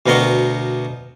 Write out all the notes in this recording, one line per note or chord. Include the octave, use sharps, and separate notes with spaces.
D2 B2 B3 A#4 G5 C#6